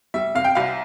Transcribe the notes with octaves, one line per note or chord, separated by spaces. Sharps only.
G3 E5
C3 F5
G5
C2 F5